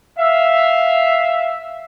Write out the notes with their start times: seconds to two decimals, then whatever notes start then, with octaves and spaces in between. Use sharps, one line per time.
0.18 E5 F5